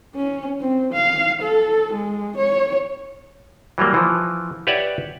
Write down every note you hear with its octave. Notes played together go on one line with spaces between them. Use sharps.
C#4
C4
F5
A4
G#3
C#5
E3 F#3 G3 A#3
E3 F3
G4 B4 C#5 D5 E5 F#5